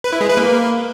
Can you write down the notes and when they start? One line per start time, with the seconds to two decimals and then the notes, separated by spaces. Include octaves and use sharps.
0.04 B4
0.12 E4
0.21 G#3
0.29 B4
0.37 A#3